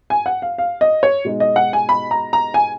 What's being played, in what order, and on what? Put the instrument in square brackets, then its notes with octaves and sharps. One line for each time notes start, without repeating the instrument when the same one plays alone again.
[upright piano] G#5
F#5
F5
F5
D#5
C#5
B2 G#3 D#4
D#5
F#5
G#5
B5
A#5
A#5
G#5